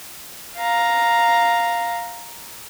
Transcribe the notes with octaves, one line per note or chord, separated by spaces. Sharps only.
F5 A#5